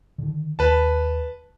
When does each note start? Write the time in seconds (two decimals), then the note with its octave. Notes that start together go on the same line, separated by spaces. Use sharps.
0.18 D3 D#3
0.59 D#2 B4 A5